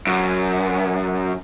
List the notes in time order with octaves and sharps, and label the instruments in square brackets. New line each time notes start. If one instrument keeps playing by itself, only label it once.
[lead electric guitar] F#2